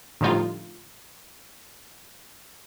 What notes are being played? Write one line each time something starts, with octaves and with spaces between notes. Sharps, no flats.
A2 D3 F3 G3 D#4 F4